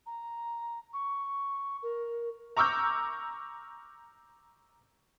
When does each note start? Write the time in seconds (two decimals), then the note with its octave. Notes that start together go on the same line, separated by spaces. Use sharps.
0.06 A#5
0.93 C#6
1.83 A#4
2.57 A#5 C#6 D6 E6 F6 G6